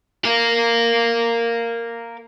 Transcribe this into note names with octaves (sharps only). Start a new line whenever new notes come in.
A#4 F5